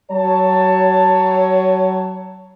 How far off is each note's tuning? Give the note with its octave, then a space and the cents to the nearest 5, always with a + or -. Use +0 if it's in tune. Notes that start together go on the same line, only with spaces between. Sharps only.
F#3 +30 C#5 +10 A5 +15